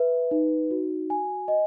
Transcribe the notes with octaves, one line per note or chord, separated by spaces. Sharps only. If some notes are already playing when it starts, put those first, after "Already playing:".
Already playing: B4 E5
D#4
F#4
G#5
D#5